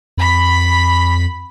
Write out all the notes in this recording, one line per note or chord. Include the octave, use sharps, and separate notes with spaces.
F2 B5 B6